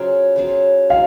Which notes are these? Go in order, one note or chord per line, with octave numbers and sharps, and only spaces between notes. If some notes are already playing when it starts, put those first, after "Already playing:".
Already playing: C#3 F#3 C4 F4
C#3 F#3 C4 F4
C#3 F#3 F5